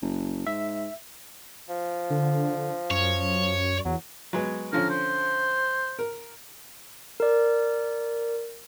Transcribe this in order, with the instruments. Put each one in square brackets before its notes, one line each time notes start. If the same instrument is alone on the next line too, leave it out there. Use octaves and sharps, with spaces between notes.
[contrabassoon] F#1
[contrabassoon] G#2 [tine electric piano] E5
[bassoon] F3
[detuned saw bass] D3
[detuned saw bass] F#2 [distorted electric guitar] C#5
[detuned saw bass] E2 [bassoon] F#3
[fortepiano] F#3 G#3 B3
[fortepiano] D3 F3 C#4 [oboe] A#4
[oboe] C5
[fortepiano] A#4
[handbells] A#4 D5